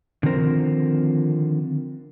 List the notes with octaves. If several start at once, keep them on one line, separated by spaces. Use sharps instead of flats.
D3 D#3 F3 C4 A#4 C5